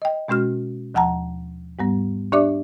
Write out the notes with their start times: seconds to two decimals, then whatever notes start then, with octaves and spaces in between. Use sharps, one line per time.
0.02 D#5 G5
0.28 B2 G#3 C#4 F#4 F6
0.94 D#2 F3 F#5 A5 A#5
1.79 G#2 G3 B3
2.32 D4 G4 D5 E5 D6